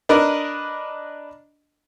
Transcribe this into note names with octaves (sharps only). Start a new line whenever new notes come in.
D4 A#4 B4 D#5